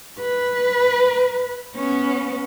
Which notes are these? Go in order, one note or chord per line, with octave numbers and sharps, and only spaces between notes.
B4
B3 C#4